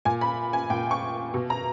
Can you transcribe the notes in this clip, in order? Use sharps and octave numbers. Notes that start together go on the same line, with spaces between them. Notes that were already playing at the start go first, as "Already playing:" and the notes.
A#2 G#5
B5
G#5
A#2 G5
C#6
B2
A#5